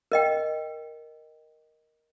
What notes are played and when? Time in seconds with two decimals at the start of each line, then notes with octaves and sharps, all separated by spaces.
0.12 A#4 D#5 G5